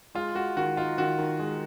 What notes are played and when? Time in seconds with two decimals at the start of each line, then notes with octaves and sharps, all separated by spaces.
0.15 G#3 F4
0.35 G#3 F#4
0.56 D#3 F#4
0.77 D#4 F4
0.98 D#3 F#4
1.18 D#3
1.39 G#3